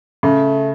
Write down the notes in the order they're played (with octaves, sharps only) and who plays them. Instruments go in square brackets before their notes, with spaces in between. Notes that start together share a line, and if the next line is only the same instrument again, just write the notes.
[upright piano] C#3 [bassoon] A3